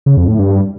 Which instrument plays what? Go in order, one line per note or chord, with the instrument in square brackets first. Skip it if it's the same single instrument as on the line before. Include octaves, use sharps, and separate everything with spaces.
[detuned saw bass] C#3
F2
A2
G2